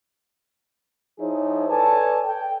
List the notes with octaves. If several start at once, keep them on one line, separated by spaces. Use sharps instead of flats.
F3 D#4 E4 G#4 C5 C#5
A4 B4 C#5 D5 G#5 A5
A4 G5